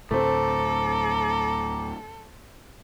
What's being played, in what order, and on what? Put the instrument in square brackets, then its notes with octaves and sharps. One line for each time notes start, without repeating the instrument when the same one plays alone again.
[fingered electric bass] D2 A2 [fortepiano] A3 C4 [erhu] A4 [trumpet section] A#5 D6